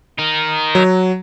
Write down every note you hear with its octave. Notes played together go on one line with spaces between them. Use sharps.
D#4 A#4
F#3